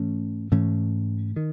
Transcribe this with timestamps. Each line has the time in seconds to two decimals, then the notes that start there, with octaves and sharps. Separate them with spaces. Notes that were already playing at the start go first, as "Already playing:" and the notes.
Already playing: G#2 E3 A3 C#4
0.51 G#2 E3 A3 C#4
1.36 D#3